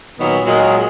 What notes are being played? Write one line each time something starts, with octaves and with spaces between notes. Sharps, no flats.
A#2 D#3 F#3 B3
A#2 F#3 G#3